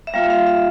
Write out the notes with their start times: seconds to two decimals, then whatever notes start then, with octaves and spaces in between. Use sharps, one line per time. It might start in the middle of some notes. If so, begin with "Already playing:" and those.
0.07 E5
0.14 G3 A#3 F4 F5
0.24 E5
0.30 F5
0.47 E5